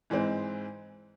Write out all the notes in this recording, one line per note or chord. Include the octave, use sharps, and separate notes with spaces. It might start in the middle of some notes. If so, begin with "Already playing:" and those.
G#2 E3 G#3 C4